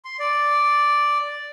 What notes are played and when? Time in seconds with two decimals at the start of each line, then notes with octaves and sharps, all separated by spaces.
0.05 C6
0.19 D5